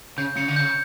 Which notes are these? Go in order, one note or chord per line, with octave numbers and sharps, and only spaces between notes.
C#3 G6
C#3 C#7
D3
C#3 G6